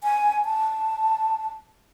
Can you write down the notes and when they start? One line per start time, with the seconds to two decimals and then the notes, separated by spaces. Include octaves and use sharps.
0.04 G#5
0.45 A5